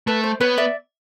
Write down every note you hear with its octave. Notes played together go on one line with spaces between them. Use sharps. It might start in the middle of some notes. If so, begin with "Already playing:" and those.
A3 B4
C5
B3 B4 C#5
D5 E5